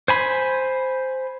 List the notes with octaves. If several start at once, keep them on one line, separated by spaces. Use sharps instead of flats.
C5 G#5 B5